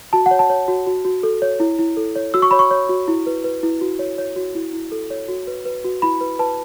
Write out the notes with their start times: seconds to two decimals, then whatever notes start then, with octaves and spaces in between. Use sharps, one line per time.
0.13 F#4 A5
0.26 F#5
0.31 C#5
0.39 A5
0.50 C#5
0.68 F#4
0.87 F#4
1.05 F#4
1.23 A4
1.42 C#5
1.60 E4
1.79 E4
1.97 A4
2.16 C#5
2.34 F#4 E6
2.42 C#6
2.51 C#5 B5
2.59 C#6
2.71 C#5
2.89 F#4
3.08 E4
3.26 B4
3.44 B4
3.63 E4
3.81 F#4
3.99 C#5
4.18 C#5
4.36 F#4
4.55 E4
4.73 E4
4.92 A4
5.10 C#5
5.28 F#4
5.47 B4
5.65 B4
5.84 F#4
6.02 E4 B5
6.21 B4
6.39 B4 A5